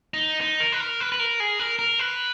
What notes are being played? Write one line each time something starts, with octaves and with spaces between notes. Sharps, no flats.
D#4
D#4
A#4
B4
A#4
B4
B4
A#4
G#4
A#4
A#4
B4